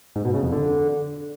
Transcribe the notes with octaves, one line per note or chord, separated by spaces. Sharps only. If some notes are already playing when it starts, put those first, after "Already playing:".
G#2
B2
C#3
F2
D3